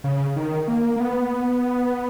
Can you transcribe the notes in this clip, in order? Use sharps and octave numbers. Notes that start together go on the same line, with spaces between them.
C#3
D#3
A#3
A#3
B3